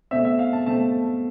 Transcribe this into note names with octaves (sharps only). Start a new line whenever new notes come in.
B2 A3 C4 E5
E5
F5
A5
B2 A3 C4 A5